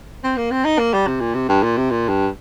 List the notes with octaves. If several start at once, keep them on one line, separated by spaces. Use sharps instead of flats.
C4
A#3
C4
D#4
A#3
G3
C3
A#2
C3
G2
A#2
C3
A#2
G2